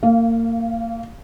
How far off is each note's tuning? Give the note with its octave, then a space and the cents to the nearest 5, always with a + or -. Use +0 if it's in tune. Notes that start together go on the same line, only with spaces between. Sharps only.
A#3 -30 F5 +0